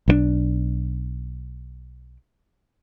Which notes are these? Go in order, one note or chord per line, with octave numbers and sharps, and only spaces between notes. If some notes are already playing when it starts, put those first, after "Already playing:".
B1 D#3 D4